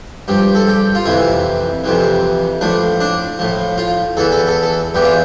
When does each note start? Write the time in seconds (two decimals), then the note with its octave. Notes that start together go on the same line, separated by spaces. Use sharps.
0.28 G2 F3 G4
0.55 A4
0.67 G4
0.95 F4
1.06 F2 C3 E3 E4
1.84 F2 C3 E3
2.61 A2 F3 D4
3.00 D4
3.39 A2 F3
3.78 F4
4.17 E2 E3 A4
4.32 A4
4.47 A4
4.62 A4
4.95 E2 E3 G4
5.04 F4